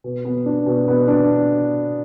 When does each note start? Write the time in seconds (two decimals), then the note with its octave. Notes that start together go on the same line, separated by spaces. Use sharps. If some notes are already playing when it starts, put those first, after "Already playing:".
0.04 B2
0.25 B3
0.46 D4
0.66 B2
0.88 B3
1.08 D4